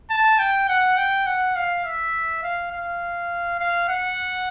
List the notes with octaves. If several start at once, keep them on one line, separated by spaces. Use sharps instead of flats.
A5
G5
F#5
G5
F#5
F5
E5
F5
F5
F5
F#5